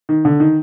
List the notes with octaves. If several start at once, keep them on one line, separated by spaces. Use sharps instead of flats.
D#3
D3
D#3